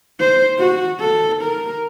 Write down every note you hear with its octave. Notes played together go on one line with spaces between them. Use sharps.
C5
F#4
A4
A#4